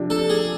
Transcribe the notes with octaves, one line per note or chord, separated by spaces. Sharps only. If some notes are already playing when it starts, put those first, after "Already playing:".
Already playing: C3 F3 D4
A4
G#4